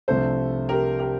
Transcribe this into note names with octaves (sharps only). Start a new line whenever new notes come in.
C2 C3 F3 A3 D4 A4 C5
G4 A#4
G4 A#4